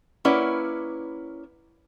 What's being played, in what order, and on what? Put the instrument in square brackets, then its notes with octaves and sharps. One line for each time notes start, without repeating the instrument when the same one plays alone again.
[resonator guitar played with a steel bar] A#3 C#4 E4 B4 D5 F#5